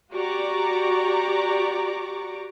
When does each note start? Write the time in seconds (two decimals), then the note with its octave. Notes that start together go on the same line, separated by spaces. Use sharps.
0.13 F#4 G4 D5 A#5 C#6 D6